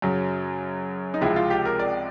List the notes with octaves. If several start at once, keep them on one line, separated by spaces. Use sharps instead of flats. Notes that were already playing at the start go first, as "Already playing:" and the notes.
F#2 C#3 F#3
D#4
C#2 C3 F3 G#3 E4
F4
G4
A#4
D5